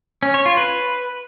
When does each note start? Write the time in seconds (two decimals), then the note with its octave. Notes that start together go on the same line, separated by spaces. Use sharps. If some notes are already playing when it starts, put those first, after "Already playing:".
0.23 C#4
0.34 C#5
0.46 F4
0.57 B4